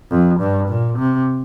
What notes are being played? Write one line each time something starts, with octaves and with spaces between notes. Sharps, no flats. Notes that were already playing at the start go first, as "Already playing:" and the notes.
F2
G2
A#2
C3